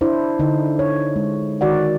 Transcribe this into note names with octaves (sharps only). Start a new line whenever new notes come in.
D4 E4 C5
D3 D#4
C#5
G#3
D#3 F#4 D5 F#5